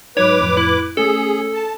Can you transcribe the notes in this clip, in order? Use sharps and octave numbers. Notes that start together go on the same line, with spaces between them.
G#2 F#3 D#4 B4 C#5 D6
F2 A2
E4
A3 C#4 G#4 A4
A5